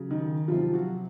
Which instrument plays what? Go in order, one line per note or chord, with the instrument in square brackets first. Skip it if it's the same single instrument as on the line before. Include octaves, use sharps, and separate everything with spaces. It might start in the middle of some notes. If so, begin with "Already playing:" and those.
Already playing: [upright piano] C#3 F#3
D#3 D#4
C3 F3 F#3 F4
F#3 F#4